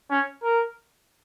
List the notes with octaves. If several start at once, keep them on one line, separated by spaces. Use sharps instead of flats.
C#4
A#4